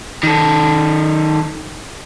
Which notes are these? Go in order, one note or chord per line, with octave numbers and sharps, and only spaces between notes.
D#3 A4